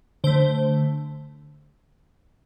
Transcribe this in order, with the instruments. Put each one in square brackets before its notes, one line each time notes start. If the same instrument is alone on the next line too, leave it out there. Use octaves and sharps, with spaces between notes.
[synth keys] D3 A3 C5